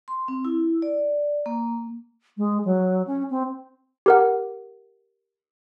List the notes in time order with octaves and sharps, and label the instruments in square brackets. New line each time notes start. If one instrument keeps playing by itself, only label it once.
[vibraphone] C6
C4
E4
D5
A#3
[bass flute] G#3
F#3
C#4
C4
[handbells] G4 A#4 F#5